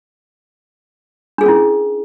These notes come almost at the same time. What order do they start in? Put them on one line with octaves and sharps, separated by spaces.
D4 G#4 A#4 C#4 E4